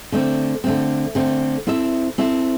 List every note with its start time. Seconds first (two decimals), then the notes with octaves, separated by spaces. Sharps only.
0.12 D3 A3 C4
0.64 D3 A3 C4
1.15 D3 A3 C4
1.67 C4 E4 A4 E5
2.18 C4 E4 A4 E5